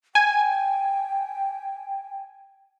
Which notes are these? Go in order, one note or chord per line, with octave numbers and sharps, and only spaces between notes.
G5 G#5